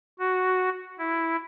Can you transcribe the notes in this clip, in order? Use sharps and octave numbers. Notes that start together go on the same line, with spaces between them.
F#4
E4